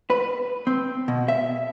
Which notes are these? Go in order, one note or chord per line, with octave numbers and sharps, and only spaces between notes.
B4
C4
B2
E5